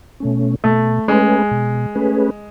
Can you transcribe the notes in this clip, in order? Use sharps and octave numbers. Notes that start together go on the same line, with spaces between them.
B2 A3 C#4
B2 A3
G#3 A3 C#4 G#4 B4
B2
A3 C#4 G#4 B4